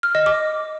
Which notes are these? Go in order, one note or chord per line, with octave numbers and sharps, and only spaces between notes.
F6
D#5
D6